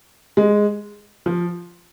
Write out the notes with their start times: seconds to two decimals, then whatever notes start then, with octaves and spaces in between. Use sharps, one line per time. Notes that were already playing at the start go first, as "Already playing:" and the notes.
0.37 G#3
1.26 F3